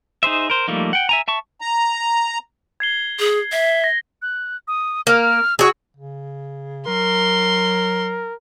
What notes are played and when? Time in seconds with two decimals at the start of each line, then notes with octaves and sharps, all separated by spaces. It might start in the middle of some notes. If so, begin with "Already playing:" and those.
0.23 D#4 G#4 C5 E5
0.50 A#4 C5
0.68 F3 G3 A3 A#3 D#4
0.93 F#5 G5
1.09 E5 G#5 A#5
1.28 E5 A5 C#6
1.61 A#5
2.80 G#6 C7 G7
3.20 G#4
3.52 E5
3.84 A#6
4.22 F#6
4.68 D#6
5.07 A#3 F6
5.59 F#4 G#4 E6
5.97 C#3
6.87 F#3 A#4 C6